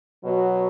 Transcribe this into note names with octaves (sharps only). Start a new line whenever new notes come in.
B2 F#3 F#4